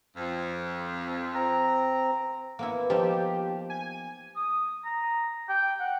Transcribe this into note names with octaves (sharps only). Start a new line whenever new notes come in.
F2
C4 A#5
A#3 B3 E4
F3 D#4 G4
G#5
D#6
A#5
G5
F#5